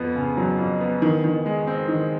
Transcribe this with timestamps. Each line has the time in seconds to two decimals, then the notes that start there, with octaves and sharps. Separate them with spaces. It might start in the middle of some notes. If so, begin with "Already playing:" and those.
Already playing: F2 B3
0.15 C#3
0.37 F#3
0.59 F2
0.81 B3
1.02 D#3
1.24 D#3
1.46 G#3
1.67 C4
1.88 D#3